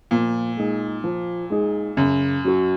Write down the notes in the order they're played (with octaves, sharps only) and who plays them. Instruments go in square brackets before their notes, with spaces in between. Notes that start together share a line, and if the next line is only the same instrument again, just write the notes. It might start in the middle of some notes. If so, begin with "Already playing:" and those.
[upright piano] A#2 [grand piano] F3
[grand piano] G#3 D#4 G#4
F3
G#3 D#4 G#4
[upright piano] F#2 [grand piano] C#3
[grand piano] F#3 C#4 F#4